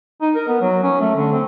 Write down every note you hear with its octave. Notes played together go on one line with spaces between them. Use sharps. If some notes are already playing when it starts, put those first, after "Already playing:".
D#4
A#4
B3
F#3
C#4
A3
D3
C4